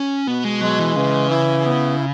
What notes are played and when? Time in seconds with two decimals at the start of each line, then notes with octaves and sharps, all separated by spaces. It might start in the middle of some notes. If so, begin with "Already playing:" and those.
Already playing: C#4
0.27 B2 B3
0.45 G#3
0.61 F#3 G#3
0.79 E3
0.96 C#3 E3
1.31 E4
1.65 B3